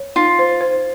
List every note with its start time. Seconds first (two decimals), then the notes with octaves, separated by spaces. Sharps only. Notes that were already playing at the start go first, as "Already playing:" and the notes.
Already playing: C#5
0.16 D#4 F4
0.39 C5
0.61 C5